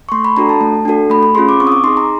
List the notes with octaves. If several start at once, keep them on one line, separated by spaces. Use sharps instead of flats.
C#6
A3 C6
B5
D4 F#4 A4 A#5
A5
A3
D4 F#4 A4
A3 B5
B5
C#4 F4 G#4 C6
D6
C4 C#6
D#6
D6
D#4 G#4 C6
A#5